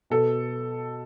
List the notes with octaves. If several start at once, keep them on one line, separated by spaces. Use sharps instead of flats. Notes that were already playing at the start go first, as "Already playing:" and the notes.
B2 A4